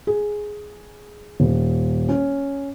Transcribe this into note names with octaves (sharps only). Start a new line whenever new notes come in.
G#4
D#1
C#4